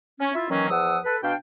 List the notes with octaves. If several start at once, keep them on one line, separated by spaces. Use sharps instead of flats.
C#4
E4 F4 E5
D#3 E3 F#3 A#3 C#4
E2 F3 F#5 D#6 E6
A4 B4
B2 D4 F5 G5